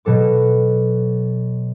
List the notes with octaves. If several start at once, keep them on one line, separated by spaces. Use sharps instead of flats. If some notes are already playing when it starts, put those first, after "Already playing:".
B2 F#3 A4 D6